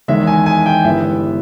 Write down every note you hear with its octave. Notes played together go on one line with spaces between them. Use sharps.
E2 D#3 G#3 E5
G#5
G#5
G5
G1 G2 E3 G#3 B3 E5